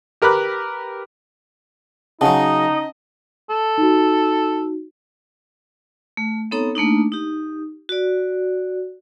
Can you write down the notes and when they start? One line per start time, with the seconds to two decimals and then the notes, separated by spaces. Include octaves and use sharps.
0.22 G4 A#4 B4 B5 D6 F#6
2.21 C#3 F#3 C#4 D#4 D#5 F#5 A5
3.50 A4
3.78 D#4 F#4
6.17 A3
6.51 B3 C4 D#4 A4 C#5 A#5
6.75 A3 A#3 D4 D#4
7.12 D#4 G4
7.89 F#4 D5